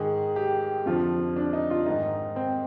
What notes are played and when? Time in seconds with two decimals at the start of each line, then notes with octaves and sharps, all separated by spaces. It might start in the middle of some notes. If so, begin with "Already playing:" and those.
Already playing: G#2 D#3 G#4
0.36 G4
0.86 F2 D3 F3 F4
1.36 D4
1.53 D#4
1.70 F4
1.86 G#2 D#3 D#4
2.36 C4